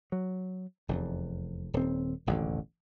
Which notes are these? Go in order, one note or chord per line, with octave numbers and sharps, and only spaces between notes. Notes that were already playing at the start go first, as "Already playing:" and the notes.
F#3
F1 E2
D#1 C4
E1 A1 D#2 D3